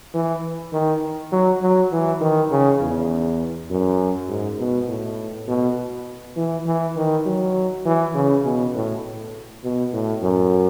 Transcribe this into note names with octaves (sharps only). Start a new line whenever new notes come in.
E3
D#3
F#3
F#3
E3
D#3
C#3
E2
F#2
G#2
B2
A2
B2
E3
E3
D#3
F#3
E3
C#3
B2
A2
B2
A2
F#2